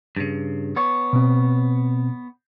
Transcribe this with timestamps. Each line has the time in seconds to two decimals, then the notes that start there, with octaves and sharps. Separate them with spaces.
0.17 G2 C#3
0.76 B3 C#5
1.13 B2 C4